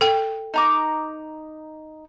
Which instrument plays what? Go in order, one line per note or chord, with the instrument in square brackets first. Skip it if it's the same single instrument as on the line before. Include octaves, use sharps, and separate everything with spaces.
[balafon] A4 G5
[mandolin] D#4 A#5 D6